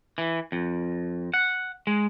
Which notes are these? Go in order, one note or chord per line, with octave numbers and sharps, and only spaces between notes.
E3
F2
F#5
G#3